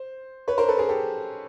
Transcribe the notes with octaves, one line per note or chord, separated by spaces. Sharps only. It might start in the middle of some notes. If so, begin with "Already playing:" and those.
Already playing: C5
B4 C#5
A#4 C5
A4 B4
G#4 A#4
G4 A4